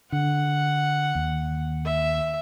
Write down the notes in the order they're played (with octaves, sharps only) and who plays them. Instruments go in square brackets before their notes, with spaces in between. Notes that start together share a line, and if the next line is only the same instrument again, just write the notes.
[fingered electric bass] D3 [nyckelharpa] F#5
[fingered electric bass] D#2
[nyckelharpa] E5